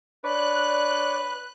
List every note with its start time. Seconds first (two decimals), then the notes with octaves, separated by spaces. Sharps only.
0.24 D4 B4 C#5 D5 F#6